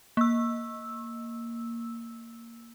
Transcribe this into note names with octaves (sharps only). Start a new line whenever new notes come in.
A#3 E6